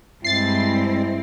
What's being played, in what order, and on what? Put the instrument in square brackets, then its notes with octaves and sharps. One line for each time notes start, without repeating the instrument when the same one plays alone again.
[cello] G2 C4 [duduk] G#3 [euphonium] E4 [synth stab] A6 C7